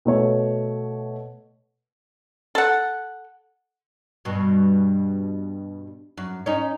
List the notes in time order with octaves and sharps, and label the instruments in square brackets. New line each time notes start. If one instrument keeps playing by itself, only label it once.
[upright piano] B2 A3 C#5
[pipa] A4 F#5
[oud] G2 B2
F#2
C#4 D#4